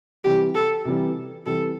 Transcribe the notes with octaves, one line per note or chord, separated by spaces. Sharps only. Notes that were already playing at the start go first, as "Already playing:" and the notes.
C3 E3 G3 G4
A4
C3 E3 G3
C3 E3 G3 A4